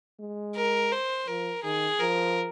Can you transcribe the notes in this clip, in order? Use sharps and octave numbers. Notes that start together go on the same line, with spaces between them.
G#3
A#4
C5
F3 A#4
D#3 G#4
F3 A#4